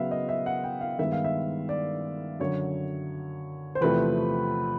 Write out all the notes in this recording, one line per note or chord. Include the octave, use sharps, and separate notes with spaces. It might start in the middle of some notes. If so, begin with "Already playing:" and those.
Already playing: C#3 F#3 B3 E5 F5
D#5
E5
F#5
G5
F5
G2 D#3 G#3 B3 E5
F5
E5
D5
F#2 D3 F#3 C#5
C5
E2 C3 F3 A3 C4 B4